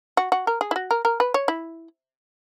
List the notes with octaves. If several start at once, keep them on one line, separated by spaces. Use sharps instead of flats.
F#4
F#4
A#4
G#4
E4
F#4
A#4
A#4
B4
C#5
E4